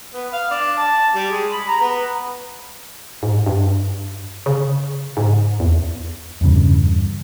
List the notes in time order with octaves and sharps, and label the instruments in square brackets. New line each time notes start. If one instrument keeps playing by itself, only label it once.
[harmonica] B3
F5
D4
A5
G3
G#3
B5
A#5
B3
[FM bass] G#2
G2
C#3
G#2
E2
[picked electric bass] E2 G2 C#3